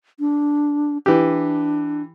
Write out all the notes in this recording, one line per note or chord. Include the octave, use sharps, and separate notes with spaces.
D4
E3 D4 G4